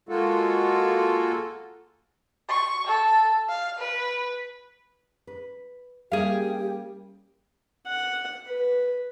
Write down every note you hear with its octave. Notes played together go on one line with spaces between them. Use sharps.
G#3 A#3 F4 F#4 A4
C#6
A4
F5
B4
B4
G3 A#3 C#4 G4 G#4 F5
F#5
B4